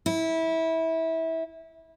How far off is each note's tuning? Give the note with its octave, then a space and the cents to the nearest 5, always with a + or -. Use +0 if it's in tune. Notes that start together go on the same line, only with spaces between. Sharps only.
E4 -20